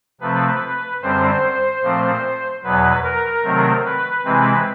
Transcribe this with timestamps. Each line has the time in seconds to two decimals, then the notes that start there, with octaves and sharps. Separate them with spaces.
0.21 C3 F3 A3 C4 B4
1.02 F#2 D3 G3 C4 C5
1.83 A#2 F3 A3 C4
2.64 E2 B2 F#3 B4
3.03 A#4
3.44 C3 D#3 F#3 A3 C4
3.85 B4
4.25 C3 E3 G#3 C4 B4